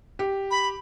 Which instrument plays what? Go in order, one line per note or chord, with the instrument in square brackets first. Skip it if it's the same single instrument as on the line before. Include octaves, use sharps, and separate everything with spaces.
[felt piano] G4
[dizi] B5